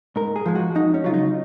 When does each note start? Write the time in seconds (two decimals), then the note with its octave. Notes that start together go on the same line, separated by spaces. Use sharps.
0.16 G#2 A#4
0.36 G#4
0.46 F3 G#3
0.55 F#4
0.75 F2 D#4
0.94 C#4
1.04 C#3 F#3 F4
1.14 D#4